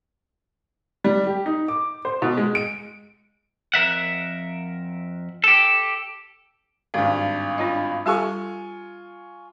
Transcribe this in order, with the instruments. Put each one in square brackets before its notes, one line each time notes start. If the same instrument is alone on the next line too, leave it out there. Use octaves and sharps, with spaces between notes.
[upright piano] G3
G4
D#4
D6
C5
B2
G#3
D7
[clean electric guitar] F2 A#4 E5 F#5
G4 A4
[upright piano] G#1 G2
[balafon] D4 F4 D#5
[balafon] G3 G4 A4 [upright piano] F4 G#5 C#6